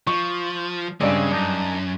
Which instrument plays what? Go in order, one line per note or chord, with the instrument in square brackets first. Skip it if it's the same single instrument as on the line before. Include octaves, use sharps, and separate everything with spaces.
[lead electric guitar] F3 [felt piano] C#6
[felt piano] G2 D5 [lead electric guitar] C#3 [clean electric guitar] G#3 C4
[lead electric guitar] F#2 [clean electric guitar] D4 D#4